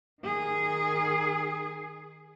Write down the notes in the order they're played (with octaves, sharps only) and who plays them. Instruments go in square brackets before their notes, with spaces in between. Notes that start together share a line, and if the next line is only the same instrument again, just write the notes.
[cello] D#3 G#4